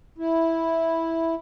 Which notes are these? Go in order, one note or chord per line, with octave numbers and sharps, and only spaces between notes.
E4